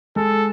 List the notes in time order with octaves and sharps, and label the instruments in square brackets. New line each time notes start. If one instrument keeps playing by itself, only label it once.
[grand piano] G#3 [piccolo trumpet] A4